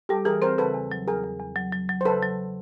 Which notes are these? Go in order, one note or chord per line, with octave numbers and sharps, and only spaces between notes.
G3 G4 A4
E3 G#4 A#4
C4 A#4 C5
C#3 A4 B4
E2
F#3
E2 G#4 A#4
E2
E2
F#3
F#3
F#3
C5
C#3 A4 B4
F#3